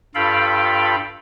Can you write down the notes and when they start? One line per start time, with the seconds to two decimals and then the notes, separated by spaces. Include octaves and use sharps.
0.15 G2 F4 A4 F5 G5 B5